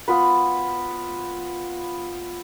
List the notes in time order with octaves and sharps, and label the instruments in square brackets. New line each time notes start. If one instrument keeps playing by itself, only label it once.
[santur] B3 F4 B4